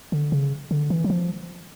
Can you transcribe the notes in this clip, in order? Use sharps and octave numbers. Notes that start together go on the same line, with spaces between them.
D3
C#3
D3
E3
F#3
F3